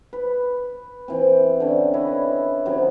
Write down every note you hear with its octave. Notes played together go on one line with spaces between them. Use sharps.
B4
E3 C4
D3 C#4
E4 B4 C#5 D#5
C3 D#3 F#3 C#4